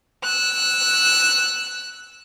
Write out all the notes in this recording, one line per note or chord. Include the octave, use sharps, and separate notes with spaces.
E6 F#6